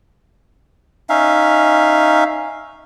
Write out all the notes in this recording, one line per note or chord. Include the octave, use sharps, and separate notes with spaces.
C#4 D#4 E5 F5